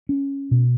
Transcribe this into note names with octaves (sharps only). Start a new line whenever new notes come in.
C#4
B2